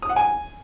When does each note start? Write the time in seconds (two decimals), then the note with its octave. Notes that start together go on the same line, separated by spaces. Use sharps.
0.02 D#6
0.09 F#5
0.16 G#5